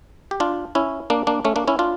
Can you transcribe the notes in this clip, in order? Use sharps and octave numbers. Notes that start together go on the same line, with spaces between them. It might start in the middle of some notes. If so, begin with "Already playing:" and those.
G4
D4 F4
C#4 E4
A#3 D4
A#3 D4
A3 C#4
A#3 D4
C#4 E4
D4 F4